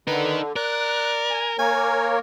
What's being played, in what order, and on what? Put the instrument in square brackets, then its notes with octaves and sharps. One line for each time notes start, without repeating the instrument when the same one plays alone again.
[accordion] D3 [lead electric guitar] D#4 A#4 [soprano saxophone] B4
[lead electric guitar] A#4 [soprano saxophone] D5 [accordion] F#6
[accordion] G#5
[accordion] A#3 A#4 C#5 [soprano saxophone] G#5